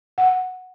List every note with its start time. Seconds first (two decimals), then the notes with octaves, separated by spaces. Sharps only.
0.18 F#5